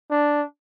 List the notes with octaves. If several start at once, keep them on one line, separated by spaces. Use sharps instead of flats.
D4